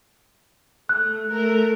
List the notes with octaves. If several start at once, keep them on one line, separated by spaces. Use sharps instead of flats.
A3 F#6
A3 A#4